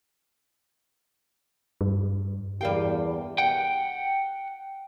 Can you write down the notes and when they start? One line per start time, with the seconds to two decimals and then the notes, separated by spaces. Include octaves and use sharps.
1.81 G2
2.61 E2 G3 G4 A#4 D5 F5 G5
3.38 F#5 G5